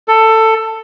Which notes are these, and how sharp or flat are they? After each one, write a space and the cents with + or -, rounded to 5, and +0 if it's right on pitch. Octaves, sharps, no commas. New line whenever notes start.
A4 +15